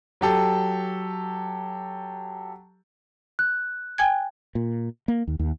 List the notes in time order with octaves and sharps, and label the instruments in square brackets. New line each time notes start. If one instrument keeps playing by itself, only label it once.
[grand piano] F#3 G4 A4
[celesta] F#6
[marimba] G5 G#5 G#6
[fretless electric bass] A#2
A#3
D#2
D#2